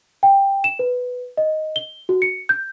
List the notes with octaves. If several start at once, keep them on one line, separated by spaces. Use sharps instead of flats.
G5
E7
B4
D#5
G7
F#4
C#7
G6